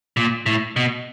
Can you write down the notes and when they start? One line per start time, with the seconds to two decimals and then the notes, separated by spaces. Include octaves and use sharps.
0.17 A#2
0.46 A2
0.76 B2